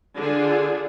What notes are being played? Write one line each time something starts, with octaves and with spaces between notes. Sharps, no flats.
D3 F4 G#4